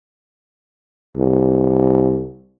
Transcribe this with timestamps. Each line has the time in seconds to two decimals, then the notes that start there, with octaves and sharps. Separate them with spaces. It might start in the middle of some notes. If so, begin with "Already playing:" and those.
1.16 C2